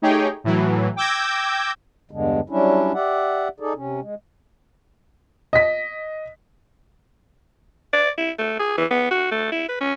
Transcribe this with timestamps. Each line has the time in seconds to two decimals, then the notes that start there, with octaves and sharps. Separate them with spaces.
0.02 A3 D#4 G4 G#4 C#5 G5
0.44 A2 E3 F#3
0.96 G5 D6 E6 G6 G#6 A#6
2.11 E2 G2 D3 G#3
2.50 F#3 G3 C#4 D4 E4
2.94 G4 D5 E5 F#5
3.60 D#4 G#4 A4 D5
3.76 C3 C#4
4.01 G#3
5.53 D#5 B6
7.93 D5
8.18 E4
8.39 A3
8.60 G#4
8.78 E3
8.91 B3
9.11 F#4
9.31 A3
9.52 E4
9.69 B4
9.81 C#4